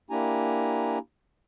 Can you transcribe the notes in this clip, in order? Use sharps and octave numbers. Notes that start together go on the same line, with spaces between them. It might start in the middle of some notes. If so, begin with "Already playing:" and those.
A#3 D4 E4 G4 G#5 A#5